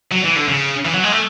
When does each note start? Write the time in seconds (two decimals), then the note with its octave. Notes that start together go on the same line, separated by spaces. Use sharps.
0.12 F#3
0.24 E3
0.36 D3
0.48 C#3
0.85 E3
0.94 F#3
1.04 G#3
1.12 A3